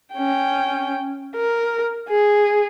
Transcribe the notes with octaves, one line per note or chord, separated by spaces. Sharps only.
C#4 G5
A#4
G#4